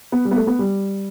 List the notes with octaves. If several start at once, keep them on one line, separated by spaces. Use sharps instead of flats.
B3
G3
B3
A3
B3
G3